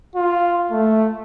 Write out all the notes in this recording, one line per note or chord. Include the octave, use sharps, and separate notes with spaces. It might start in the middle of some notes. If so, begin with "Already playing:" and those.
F4
A3